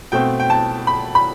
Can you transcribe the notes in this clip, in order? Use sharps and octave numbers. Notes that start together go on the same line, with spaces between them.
B2 A3 C4 G5
G5
A5
B5
B5